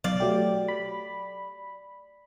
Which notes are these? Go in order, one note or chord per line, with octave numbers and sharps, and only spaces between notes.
B1 D5 F5
F#3 A3 G4
B5